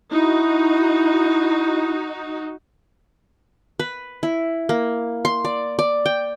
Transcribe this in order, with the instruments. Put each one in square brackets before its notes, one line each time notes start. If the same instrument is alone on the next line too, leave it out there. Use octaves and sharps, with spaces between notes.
[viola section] D#4 F#4 [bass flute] E4
[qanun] B4
E4
A#3
C6
D5
D5
G5